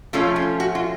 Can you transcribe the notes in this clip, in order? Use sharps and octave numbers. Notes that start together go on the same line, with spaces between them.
F3 A3 C#4 F4
F4
F#4
F4